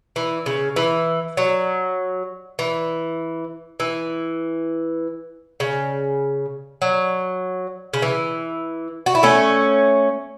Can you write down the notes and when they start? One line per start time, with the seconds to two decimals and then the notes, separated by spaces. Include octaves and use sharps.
0.16 E3
0.46 C#3
0.76 E3
1.37 F#3
2.59 E3
3.80 E3
5.60 C#3
6.82 F#3
7.93 C#3
8.02 E3
9.06 F#4
9.15 E4
9.23 A3 C#4